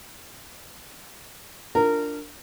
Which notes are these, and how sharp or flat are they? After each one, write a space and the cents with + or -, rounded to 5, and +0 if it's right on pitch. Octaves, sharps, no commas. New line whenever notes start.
D4 +0 F4 +0 A#4 -20